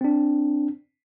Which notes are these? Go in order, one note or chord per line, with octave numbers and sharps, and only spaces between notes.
C4 D4